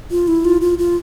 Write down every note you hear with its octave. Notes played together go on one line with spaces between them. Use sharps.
F4
E4
F4
F4
F4